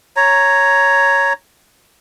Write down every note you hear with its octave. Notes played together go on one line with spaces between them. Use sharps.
C#5 A#5